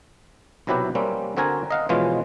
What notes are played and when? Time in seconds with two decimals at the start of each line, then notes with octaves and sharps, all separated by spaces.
0.67 B1 C3 F#3 E4 G4 B4
0.95 G3 A#3 C4 C#4
1.37 D3 C4 F#4 A#4 G#5 A#5
1.70 D#5 F5 F#5
1.89 B2 E3 F3 G#3 C#4 F4